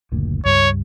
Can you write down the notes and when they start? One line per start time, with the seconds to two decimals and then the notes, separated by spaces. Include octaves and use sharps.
0.12 F#1 D2 A#2
0.45 C#2 G2 G3 C#5